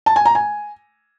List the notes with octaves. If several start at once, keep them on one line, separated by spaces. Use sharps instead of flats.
A5
G#5
A#5
G#5